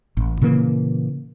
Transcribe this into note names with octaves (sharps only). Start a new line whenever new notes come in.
A1
A#2 C#3 E3 A#3